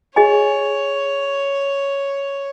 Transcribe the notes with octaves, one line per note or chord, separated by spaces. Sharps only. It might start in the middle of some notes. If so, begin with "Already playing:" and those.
G#4 C#5 D#5 G#5